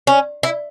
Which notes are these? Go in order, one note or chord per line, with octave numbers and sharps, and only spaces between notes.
C#4
E4